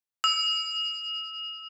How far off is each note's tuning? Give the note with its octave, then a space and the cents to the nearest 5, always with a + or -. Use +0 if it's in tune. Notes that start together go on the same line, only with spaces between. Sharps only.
E6 -20